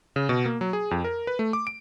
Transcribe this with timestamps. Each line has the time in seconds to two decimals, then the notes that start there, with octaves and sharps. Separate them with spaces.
0.16 C#3
0.29 B2
0.46 A#3
0.61 F#3
0.73 G#4
0.91 F2
1.04 A#4
1.27 B4
1.39 A3
1.53 D6
1.67 D7